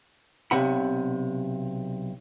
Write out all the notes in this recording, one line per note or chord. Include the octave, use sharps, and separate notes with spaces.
B1 C3 F#5 B5